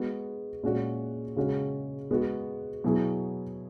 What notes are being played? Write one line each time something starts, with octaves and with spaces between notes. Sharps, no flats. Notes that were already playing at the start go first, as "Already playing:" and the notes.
Already playing: G#3 B3 F#4
A#2 G#3 C#4 F#4
C#3 G#3 C#4 F#4
G#3 B3 F#4
B2 F#3 B3 E4 G#4